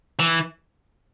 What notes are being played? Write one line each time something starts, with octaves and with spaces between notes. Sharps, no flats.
E3